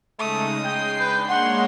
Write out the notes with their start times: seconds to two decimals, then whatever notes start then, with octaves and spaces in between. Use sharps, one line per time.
0.19 C#3 G#3 A3 D#4 D#6
0.65 G#3 G5 C7
1.00 D4 B4 G6
1.29 G#3 A#3 C#5 F#5 C6